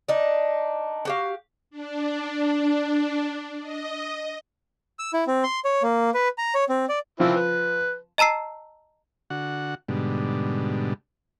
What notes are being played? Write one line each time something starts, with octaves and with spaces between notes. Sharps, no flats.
D4 D#4
F#4 G4 F5
D4
D#5
E6
E4
C4
C6
C#5
A#3
B4
A#5
C#5
C4
D5
E3 F3 C4 E4
B4
D#5 A5 A#5 E6 C7
D3 F#4 F#5
G#2 B2 D3 G3